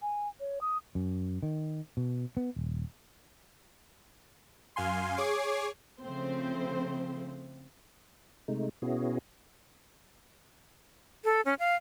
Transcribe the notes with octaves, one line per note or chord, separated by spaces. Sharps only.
G#5
C#5
D#6
F#2
D#3
B2
B3
D#1
F#2 F5 G#5 C6
G#4 C#5 D6 G#6 C7
C#3 F3 A3 C4 C5
C3 G#3 A3 D#4
B2 B3 C#4 E4 F#4 G#4
A4
C#4
F5